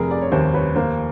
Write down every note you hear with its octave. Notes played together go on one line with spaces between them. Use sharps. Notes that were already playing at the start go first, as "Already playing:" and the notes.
Already playing: F1 C3 G#4 A#4
D5
C#5
D#2 A#4 C5
B4 C#5
A#3 A#4 C5